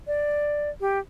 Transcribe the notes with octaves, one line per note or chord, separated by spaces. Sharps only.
D5
G4